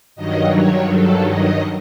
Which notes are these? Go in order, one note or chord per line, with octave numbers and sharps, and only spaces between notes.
G2 D#3 F#3 D#5
C#5
A4
D#5